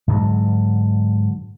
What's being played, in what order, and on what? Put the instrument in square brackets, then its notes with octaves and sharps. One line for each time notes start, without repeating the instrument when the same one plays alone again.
[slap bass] G#2 D3 F#3